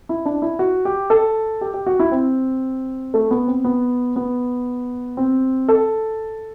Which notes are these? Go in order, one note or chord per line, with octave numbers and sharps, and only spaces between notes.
E4
D4
E4
F#4
G4
A4
G4
G4
F#4
E4
C4
A3
B3
C4
B3
B3
C4
A4